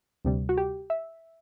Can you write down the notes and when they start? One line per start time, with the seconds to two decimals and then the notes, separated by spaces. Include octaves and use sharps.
0.25 D2 C3 G3
0.49 F#4
0.58 G4
0.90 E5